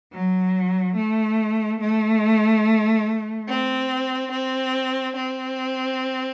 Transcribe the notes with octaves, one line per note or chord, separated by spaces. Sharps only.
F#3
A3
A3
C4
C4
C4